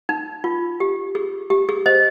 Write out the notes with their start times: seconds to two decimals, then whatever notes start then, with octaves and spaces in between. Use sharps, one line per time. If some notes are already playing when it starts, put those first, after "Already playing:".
0.09 D#4
0.44 F4
0.80 G4
1.15 G#4
1.50 G4
1.69 G#4
1.86 C5 D#5